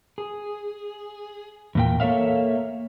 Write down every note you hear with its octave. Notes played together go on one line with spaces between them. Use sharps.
G#4
E2 A#2 G5
A#3 A4 C#5 E5 F5